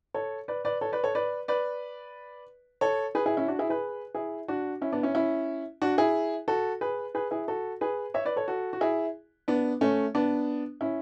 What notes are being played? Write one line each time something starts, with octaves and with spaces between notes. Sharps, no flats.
A4 C#5
B4 D5
B4 D5
A4 C#5
B4 D5
A4 C#5
B4 D5
B4 D5
A4 C#5
G#4 B4
E4 G#4
C#4 E4
D4 F#4
E4 G#4
G#4 B4
E4 G#4
D4 F#4
C#4 E4
B3 D4
C#4 E4
C#4 E4
D4 F#4
E4 G#4
F#4 A4
G#4 B4
G#4 B4
E4 G#4
F#4 A4
G#4 B4
C#5 E5
B4 D5
A4 C#5
F#4 A4
F#4
E4 G#4
B3 D4
A3 C#4
B3 D4
C#4 E4